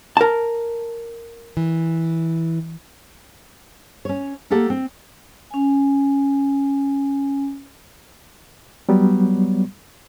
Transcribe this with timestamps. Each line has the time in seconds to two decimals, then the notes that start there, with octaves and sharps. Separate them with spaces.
0.17 A#4 A5
1.57 E3
4.05 C#4 C#5
4.50 A3 A#3 G4 A4 F#5
4.70 C4
5.51 C#4 G#5
8.89 F#3 G3 B3